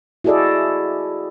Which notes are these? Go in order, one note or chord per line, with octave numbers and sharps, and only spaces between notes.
E4 F#4 G#4 A4 D5 D#5